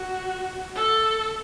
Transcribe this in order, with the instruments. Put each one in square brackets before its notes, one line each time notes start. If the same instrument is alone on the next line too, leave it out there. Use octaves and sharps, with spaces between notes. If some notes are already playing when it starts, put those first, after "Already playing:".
Already playing: [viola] F#4
A4